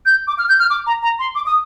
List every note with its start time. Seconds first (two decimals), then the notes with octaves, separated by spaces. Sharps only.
0.06 G6
0.28 D6
0.39 F6
0.49 G6
0.59 F6
0.70 D6
0.87 A#5
1.03 A#5
1.19 C6
1.35 D6
1.46 D#6